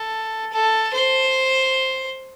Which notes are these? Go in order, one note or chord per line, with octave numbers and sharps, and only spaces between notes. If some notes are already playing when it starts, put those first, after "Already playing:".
Already playing: A4
A4
C5